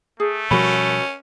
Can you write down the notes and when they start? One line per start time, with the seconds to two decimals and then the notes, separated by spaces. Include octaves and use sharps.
0.20 A3 G#4
0.51 B2 F3 G3 C#4 F#4 A#4 B5